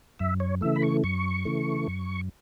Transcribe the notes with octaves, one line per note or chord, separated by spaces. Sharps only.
F#2 E5
C#5
C#3 E3 A3 E5
B5
C#6
F#2 C#6
C#3 E3 A3
F#2